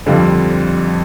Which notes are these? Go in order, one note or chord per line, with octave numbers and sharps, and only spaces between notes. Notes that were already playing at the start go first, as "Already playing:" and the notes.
F2 D3 G3 C4 F4